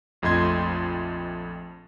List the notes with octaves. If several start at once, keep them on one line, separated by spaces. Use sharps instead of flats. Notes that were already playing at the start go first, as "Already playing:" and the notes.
A#1 F2 A3 D#5 C6 G#6